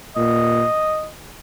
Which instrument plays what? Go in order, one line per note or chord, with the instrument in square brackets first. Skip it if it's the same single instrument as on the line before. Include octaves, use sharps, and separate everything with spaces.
[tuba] A#2 [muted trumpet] D#5